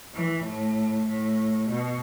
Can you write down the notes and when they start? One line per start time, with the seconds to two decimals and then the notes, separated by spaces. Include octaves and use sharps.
0.15 E3
0.45 A2
1.07 A2
1.70 B2